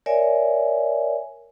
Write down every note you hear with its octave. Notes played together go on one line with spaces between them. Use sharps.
A#4 C#5 D5 E5 G#5